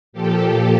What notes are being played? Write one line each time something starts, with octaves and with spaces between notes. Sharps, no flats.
A#2 F3 G4 A4